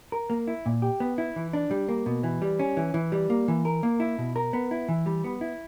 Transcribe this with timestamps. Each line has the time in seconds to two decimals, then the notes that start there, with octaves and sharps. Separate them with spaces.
0.12 A#4
0.30 A#3
0.48 E4
0.66 A#2
0.82 G4
1.00 B3
1.18 E4
1.36 E3
1.53 D4
1.71 G3
1.89 A#3
2.06 B2
2.24 E3
2.42 G3
2.59 C#4
2.77 E3
2.94 E3
3.12 G3
3.30 A#3
3.48 E3
3.65 A#4
3.83 A#3
4.00 E4
4.18 B2
4.36 A#4
4.53 B3
4.71 E4
4.89 E3
5.06 G3
5.24 B3
5.41 E4